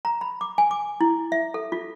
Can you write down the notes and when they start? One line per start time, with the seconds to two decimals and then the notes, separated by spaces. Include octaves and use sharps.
0.05 A#5
0.21 B5
0.41 D6
0.58 G#5
0.71 D6
1.01 E4
1.32 E5
1.54 A4
1.72 F4